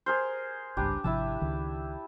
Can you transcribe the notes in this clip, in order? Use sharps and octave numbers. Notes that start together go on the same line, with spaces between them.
G#4 A#4 C5
G#1 C#2 G2 D4 G4 B4
G#1 C3 F3 E4 E5 A5
C#2 D#3